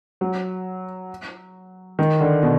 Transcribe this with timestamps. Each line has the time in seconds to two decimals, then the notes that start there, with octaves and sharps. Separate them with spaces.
0.21 F#3
1.99 D#3
2.21 D3
2.43 B2